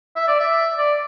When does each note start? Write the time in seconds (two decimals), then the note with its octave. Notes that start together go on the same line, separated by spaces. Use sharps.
0.16 E5
0.28 D5
0.40 E5
0.78 D5